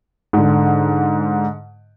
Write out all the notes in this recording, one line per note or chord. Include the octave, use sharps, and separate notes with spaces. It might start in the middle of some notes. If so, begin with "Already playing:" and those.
G#2 D3